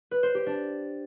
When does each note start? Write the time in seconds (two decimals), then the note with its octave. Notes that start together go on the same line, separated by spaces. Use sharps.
0.11 B4
0.23 C5
0.35 G4
0.46 D4